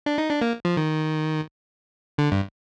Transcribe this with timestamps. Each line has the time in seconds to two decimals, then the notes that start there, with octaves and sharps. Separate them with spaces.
0.06 D4
0.18 D#4
0.29 D4
0.42 A#3
0.65 F3
0.77 D#3
2.18 D3
2.32 G2